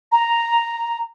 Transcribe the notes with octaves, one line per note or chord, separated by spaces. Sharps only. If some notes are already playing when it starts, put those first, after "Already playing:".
A#5